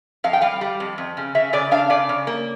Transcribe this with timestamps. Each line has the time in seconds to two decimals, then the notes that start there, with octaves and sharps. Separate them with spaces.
0.24 F2 F5
0.33 G5
0.42 G3 F5
0.61 G3
0.80 F2
0.98 F2
1.17 C#3
1.35 C#3 E5
1.53 C#3 D5
1.71 D4 F5
1.90 C#3 D5
2.09 C#3
2.27 A#3